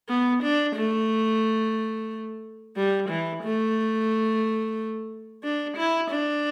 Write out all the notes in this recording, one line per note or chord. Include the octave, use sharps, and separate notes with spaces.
B3
D4
A3
G3
E3
A3
D4
E4
D4